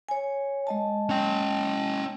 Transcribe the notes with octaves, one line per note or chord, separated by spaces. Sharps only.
C#5 G#5
G#3 D#5 A5
C#4 G5